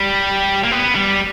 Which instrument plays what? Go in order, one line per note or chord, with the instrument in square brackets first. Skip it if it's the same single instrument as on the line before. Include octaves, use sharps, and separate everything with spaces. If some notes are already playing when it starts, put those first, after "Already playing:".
Already playing: [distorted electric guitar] G3
A#3
B3
G3